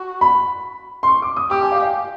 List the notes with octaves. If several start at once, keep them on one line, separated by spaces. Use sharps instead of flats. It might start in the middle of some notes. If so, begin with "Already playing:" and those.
Already playing: F#4
B5
C6
C#6
D6
D#6
G4 D6
G#5
F5
F5